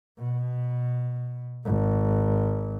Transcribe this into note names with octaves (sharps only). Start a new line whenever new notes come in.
B2
G#1